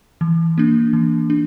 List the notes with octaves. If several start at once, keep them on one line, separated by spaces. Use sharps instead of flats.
E3
A#3 D4
E3
D4